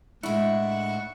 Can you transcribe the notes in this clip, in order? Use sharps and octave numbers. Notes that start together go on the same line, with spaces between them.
A2 G#3 D4 E4 F#5 C#6